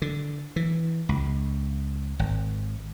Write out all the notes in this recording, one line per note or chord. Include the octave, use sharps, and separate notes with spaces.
D3
E3
C#2
G#1